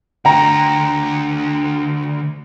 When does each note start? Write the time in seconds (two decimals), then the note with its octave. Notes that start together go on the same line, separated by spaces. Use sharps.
0.25 D2 D3 G5 A#5